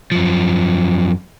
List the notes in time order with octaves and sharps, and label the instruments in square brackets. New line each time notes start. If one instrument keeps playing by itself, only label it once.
[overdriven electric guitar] F#2 F3